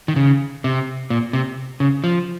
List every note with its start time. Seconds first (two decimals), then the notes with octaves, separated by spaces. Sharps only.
0.08 D#3
0.16 C#3
0.64 C3
1.10 A#2
1.33 C3
1.80 C#3
2.04 F3